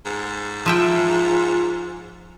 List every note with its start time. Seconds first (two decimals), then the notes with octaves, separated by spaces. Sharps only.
0.05 G#2
0.66 F3 E4 F4 G5